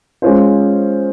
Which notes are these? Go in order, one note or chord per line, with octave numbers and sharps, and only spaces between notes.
G#3 C#4 F4 C5